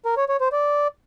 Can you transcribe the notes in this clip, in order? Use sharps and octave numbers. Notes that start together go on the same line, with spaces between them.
A#4
C#5
C#5
C5
D5